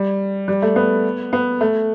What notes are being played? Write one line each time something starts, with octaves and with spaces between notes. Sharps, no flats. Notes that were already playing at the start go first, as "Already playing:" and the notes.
Already playing: G3
G3
A3
B3
B3
A3